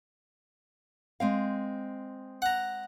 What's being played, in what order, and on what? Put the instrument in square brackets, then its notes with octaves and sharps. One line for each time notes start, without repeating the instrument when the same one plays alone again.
[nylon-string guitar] G#3 C4 F5
[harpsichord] F#5 A#5